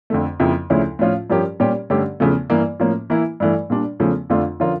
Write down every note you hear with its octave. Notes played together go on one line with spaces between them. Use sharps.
F2 D3 A3
F2 C#3 F3 A#3 E4
D2 C#3 F3 C#4 E4
A2 F3 C#4 F4
G2 F3 C#4 G4 A#4
A#2 G3 C#4 G4
G2 D3 A3 C#4 G4
E2 C#3 F3 A3
G2 E3 A#3
A2 F3 A#3 C#4
E3 A#3 E4
G2 E3 A3
A#2 G3 D4
E2 C#3 F3 A3 C#4
F2 D3 A3 D4 F4
D3 F3 C#4 F4 A#4